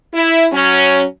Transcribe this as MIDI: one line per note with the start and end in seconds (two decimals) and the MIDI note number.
0.13 0.47 64
0.52 1.04 54
0.52 1.04 61